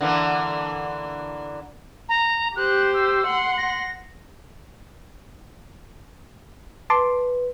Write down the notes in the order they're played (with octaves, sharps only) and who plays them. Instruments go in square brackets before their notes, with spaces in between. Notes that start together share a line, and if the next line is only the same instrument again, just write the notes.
[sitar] D3 E3 A#3
[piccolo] A#5
[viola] G4 C5 [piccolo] F#6
[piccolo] E6
[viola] F#5 C6
[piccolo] A#6
[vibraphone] B4 [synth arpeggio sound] A5 C6 D6